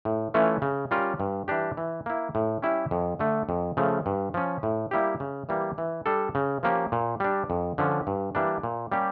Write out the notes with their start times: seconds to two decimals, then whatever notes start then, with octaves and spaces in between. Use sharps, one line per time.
0.05 A2
0.34 E3 A3 C#4 F4
0.62 C#3
0.91 G3 C#4 F4 A#4
1.20 G2
1.48 E3 G3 D4 G4
1.77 E3
2.06 A#3 E4
2.35 A2
2.62 G3 C#4 E4 G4
2.91 F2
3.19 D3 A3
3.49 F2
3.77 C#3 F3 A3
4.06 G2
4.34 F3 C#4
4.63 A2
4.91 G3 A#3 E4 G4
5.20 C#3
5.49 E3 G3 A#3
5.78 E3
6.06 G3 D4 A4
6.35 C#3
6.63 F3 A#3 C#4 G4
6.92 A#2
7.20 G3 D4
7.50 F2
7.78 D3 F3 C#4
8.07 G2
8.35 E3 G3 A#3 D4
8.63 A#2
8.92 G3 A#3 C#4 G4